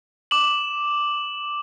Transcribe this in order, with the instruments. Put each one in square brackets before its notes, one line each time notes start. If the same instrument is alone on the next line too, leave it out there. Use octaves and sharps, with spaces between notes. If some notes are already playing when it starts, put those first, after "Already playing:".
[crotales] D6 E7 F#7